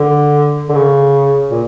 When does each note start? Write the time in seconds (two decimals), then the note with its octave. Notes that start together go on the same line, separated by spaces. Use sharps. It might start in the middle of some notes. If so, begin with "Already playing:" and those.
Already playing: D3
0.69 D3
0.75 C#3
1.50 A#2